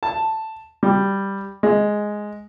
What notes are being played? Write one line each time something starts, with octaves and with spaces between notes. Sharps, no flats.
A5
G3
G#3